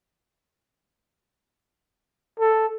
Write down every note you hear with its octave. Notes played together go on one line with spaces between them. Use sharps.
A4